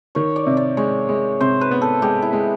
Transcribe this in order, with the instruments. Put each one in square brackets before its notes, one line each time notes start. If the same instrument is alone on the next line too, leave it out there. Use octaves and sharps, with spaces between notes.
[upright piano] D#3 [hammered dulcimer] C#5
[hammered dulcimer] D5
[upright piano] C3
[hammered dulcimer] D5
[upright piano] G#3 [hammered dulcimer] C#5
[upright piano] G#3
[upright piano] C3 [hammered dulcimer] C5
[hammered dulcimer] B4
[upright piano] B3
[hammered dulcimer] A4
[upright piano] G#3 [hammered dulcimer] G4
[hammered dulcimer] E4
[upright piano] G#3